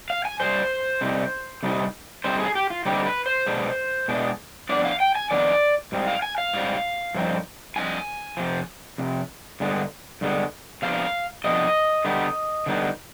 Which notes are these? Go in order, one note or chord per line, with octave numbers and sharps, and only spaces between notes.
F5
G#5
G2 D#3 G3 C5
C3 G3 C4 D#4
C3 G3 C4 D#4
D3 G3 C4 D#4 C5
G#4
G4
F4
D3 G3 C4 D#4 G4
B4
C5
B2 G#3 B3 D4
B2 G#3 B3 D4
F2 D#3 B3 D4 D5
F5
G5
G#5
F2 D#3 B3 D4 D5
G#2 G3 C4
F5
G#5
F5
G#2 G3 C4
G2 F3 C4 D#4
G2 F3 C4 D#4 G#5
F2 C3 F3
F2 C3
G2 D3 G#3 B3
G2 D3 G#3 B3
C3 F3 B3 D4 F5
C3 F3 B3 D4 D#5
D3 G3 B3 D#4
D3 G3 B3 D#4